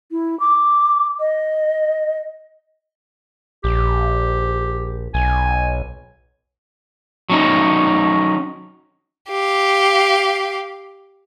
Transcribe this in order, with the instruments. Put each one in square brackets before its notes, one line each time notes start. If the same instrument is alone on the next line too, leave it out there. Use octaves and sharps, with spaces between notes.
[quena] E4
D6
D#5
[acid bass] A#1 [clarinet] G4
[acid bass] B1 [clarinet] G#5
[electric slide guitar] F#3 C#4 D#4
[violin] G4 F5